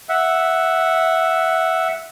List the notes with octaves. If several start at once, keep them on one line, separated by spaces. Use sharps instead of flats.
E5 F#5